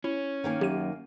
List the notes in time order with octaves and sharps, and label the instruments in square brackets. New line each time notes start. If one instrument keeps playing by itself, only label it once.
[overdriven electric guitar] C#4 [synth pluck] E4
[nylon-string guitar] D#3 A#3 G#5
[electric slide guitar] F#2 [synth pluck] G4 D#7